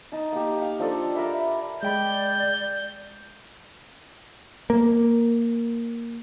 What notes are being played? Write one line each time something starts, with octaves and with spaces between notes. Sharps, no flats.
D#4 A5 D#6
A#3 G4
F5
F3 D4 A4 D5
A#4 D5 E5 B5
G#3 D5 G5 B5 G6
A#3